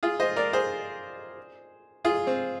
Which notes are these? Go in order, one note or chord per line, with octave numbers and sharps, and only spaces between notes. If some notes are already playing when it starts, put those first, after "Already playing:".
F4 G#4
C5 D#5
A#4 D5
G#4 C5
F4 G#4
C4